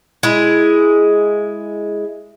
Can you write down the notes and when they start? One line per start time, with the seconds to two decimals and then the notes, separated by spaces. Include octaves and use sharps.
0.23 G#3 E4